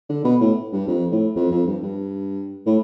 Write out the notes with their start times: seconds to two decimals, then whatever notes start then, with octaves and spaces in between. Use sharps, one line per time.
0.09 D3
0.24 B2
0.40 A2
0.72 G2
0.87 F2
1.11 A2
1.36 F2
1.51 F2
1.67 G2
1.83 G2
2.66 A2